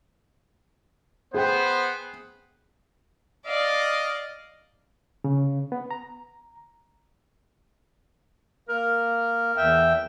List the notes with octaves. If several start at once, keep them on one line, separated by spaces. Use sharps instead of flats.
B3 G#4 C5 G5
D5 D#5 F5
C#3
B3
A#5
A#3 A#4
E2 E5 G5